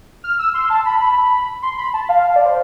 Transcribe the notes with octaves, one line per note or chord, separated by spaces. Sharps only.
F6
E6
C6
A5
B5
B5
C6
B5
A5
F5
D5
C5